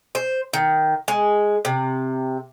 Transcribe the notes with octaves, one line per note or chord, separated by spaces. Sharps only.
C5
D#3
G#3
C3